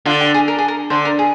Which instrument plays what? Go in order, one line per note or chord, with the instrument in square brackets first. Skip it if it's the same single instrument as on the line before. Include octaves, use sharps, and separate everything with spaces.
[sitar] D3 [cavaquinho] F4
[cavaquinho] G4
G#4
A#4
G#4
A#4
[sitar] D3 [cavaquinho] C5
[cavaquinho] A#4
G#4